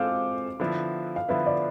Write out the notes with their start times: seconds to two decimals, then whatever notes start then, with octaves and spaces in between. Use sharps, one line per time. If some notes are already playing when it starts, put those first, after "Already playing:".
Already playing: G#3 C4 F4 A4 C5 F5 D6
0.60 D3 F3 B3 E4 B4
1.16 F5
1.28 D3 F3 B3 E4 B4 E5
1.46 D5